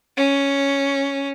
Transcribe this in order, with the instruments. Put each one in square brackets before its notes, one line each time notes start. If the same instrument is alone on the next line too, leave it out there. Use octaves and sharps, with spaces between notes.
[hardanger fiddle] C#4